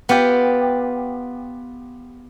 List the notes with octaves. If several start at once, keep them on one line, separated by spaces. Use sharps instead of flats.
B3 F4 G4